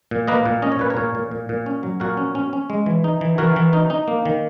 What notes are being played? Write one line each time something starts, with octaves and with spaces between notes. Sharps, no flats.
A#2
A#3 B4 D#5
A#2
C#4 D#5
C#5
A#2 B4
A#4 C#5
A#2
A#2
A#2
A#2
C#4
F#3
A#2 F#4 A#4
C#4
C#4
C#4
G#3
E3
D#4
E3
E3 F#4 A#4
E3
D#4
D#4
A#3
D#3